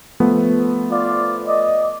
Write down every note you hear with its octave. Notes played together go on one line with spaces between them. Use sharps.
F3 A3 B3
F4 D5
D5 D#5